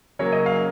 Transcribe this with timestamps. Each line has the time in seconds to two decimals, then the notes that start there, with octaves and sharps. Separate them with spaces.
0.19 C#3 F#3 A#3 C#5
0.32 D#5
0.46 F5